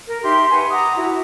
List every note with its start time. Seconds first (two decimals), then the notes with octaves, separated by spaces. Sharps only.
0.07 A#4
0.23 D#4 G4 E5 C6
0.51 B4 F#5 G#5
0.70 F#5 A#5 D6 D#6
0.95 E4 F#4